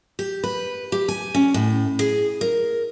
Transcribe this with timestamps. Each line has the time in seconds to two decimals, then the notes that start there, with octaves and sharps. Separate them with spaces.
0.19 G4
0.44 B4
0.92 G4
1.08 G#5
1.34 C#4
1.54 A2
1.99 G#4
2.41 A#4